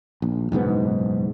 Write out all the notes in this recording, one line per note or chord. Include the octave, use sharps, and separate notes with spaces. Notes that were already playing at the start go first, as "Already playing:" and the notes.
A#1
F#1 B1 G#2 B3